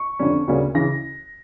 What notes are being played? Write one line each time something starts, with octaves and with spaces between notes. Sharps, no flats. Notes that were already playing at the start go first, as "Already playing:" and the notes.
Already playing: C#6
F2 D3 G3 C#4
D2 C#3 G3 A#3 C#4
C#3 E3 A#6